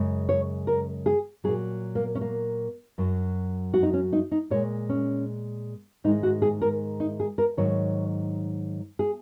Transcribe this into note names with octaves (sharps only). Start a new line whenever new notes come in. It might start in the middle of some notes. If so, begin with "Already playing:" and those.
Already playing: F#2 C#3 G#3
C#5
A#4
G#4
A#2 F#3 G#4
A#3
C#4
A#3
F#2 F#3
F#4
D#4
C#4
D#4
D#4
A#2 G#3 C#5
C#4
G#2 D#3 G#3 D#4
F#4
G#4
A#4
D#4
G#4
A#4
G#2 D#3 F#3 C#5
G#4